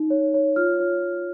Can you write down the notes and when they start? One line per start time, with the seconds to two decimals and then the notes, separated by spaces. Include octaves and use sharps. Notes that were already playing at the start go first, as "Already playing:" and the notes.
Already playing: D#4
0.10 C#5
0.34 C#5
0.56 F4 F6
0.80 C#5
1.03 C#5